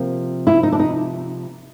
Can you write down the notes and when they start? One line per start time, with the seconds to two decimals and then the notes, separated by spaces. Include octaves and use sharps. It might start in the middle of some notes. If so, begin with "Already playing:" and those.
Already playing: C3 F3 A#3
0.47 E4
0.63 D#4
0.72 D4
0.79 D#4